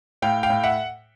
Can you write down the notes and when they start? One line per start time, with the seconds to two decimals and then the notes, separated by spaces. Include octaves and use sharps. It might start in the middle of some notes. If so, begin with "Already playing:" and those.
0.22 A2 F5 G5
0.43 F5 G5
0.50 A2
0.63 E5 F#5